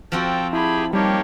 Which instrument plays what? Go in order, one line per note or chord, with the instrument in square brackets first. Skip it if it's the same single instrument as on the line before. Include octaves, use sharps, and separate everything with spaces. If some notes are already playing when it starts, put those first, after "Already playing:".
[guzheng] F3 C4 F#4 [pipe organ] A4 G5
[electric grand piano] E4 [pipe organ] G4 G#4 [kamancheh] A5 B5
[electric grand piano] G3 [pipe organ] A#3 G4 C#5 [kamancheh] D#4 A5